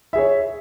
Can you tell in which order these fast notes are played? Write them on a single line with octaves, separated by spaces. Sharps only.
E5 G#4 C#5